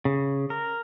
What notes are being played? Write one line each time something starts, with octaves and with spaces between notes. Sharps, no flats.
C#3
A#4